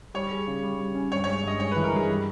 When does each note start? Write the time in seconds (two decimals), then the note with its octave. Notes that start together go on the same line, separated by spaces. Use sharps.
0.14 G3 C#5
0.31 G#4
0.47 C#3
0.63 G3
0.80 G3
0.95 C#4
1.12 G2 C#5
1.24 C#5
1.27 G#3
1.43 G2 D#5
1.60 G#3 C#5
1.72 B4
1.76 E3
1.84 A#4
1.92 G2 G#4
2.08 G3